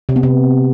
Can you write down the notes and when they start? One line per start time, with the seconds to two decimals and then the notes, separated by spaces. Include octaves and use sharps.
0.09 C3
0.16 B3
0.23 C3